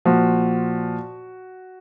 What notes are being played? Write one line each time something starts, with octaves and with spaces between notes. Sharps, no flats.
A#2 F3 F#4